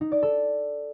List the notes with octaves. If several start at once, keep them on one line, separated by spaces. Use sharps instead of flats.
D#4
D5
A4